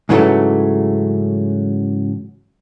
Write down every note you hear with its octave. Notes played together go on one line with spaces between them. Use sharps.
G#2 C#3 E3 F#3 G3 A3